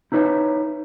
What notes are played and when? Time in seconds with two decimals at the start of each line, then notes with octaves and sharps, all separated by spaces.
0.12 D#4 E4 B4 C#5